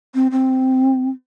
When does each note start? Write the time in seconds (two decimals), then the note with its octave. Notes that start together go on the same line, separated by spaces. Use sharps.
0.15 C4
0.31 C4